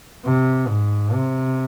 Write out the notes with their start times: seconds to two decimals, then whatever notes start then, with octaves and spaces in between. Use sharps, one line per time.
0.24 C3
0.68 G#2
1.14 C3